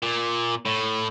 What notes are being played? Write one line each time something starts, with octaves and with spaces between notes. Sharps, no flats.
A#2
A2